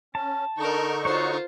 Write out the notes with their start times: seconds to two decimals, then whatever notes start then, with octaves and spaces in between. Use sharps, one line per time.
0.15 C#4 A5
0.57 D3 D#4 A4 A#4 C#6
1.05 F4 F#4 C5 C#5